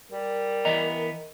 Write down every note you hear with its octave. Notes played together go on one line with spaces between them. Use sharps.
G3 A#4
E3 B3 D#5 G5 A#5